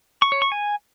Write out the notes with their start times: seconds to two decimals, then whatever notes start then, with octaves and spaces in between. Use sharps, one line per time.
0.22 C#6
0.32 C#5
0.42 C#6
0.52 G#5